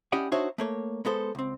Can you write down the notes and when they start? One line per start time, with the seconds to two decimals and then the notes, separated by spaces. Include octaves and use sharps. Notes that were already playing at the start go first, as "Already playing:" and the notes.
0.12 C#4 E4 G4 D5 D#5 F#5
0.32 D4 D#4 F#4 C5 C#5 E5
0.58 A3 A#3 C#5
1.05 G#3 B3 A4 C5
1.35 C#2 C4